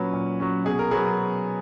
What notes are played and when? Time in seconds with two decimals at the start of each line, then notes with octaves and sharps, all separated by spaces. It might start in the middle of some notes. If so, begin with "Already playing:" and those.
Already playing: A#2 F#3 C#4 B4
0.13 A#2
0.40 F#3 C#4
0.65 B2 G#4
0.79 A#4
0.91 F#3 B3 G#4